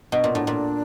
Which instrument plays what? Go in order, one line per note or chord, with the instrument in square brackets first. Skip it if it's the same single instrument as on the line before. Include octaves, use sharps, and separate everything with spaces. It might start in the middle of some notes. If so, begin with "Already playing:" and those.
[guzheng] B2 [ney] D4
[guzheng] A#2
[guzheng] A2 [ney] D4
[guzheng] A#2